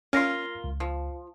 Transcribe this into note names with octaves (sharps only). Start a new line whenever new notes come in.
A#3 C#4 F4 F6 A#6 C7
C#2
F3